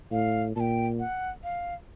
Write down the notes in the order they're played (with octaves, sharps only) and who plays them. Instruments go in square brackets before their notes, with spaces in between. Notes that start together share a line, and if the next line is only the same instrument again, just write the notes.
[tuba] A2 [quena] F5
[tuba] A#2 [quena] A5
[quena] G5
F#5
F5